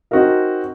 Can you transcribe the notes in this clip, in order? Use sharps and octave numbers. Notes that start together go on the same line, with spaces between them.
C4 D#4 F#4 A#4 D#5